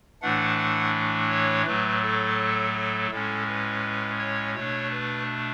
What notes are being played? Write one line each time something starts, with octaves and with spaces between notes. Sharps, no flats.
A2 E3 A3 D4 F#5
F#5
C#5
A2 F#3 A3 B4
A4
A4
A2 G#3 C#4 A4
B4
C#5
B2 A3 D4 C#5
B4